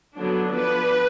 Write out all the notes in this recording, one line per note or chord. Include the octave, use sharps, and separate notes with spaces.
D3 F#3 B3 D4
F3 B3 D4 B4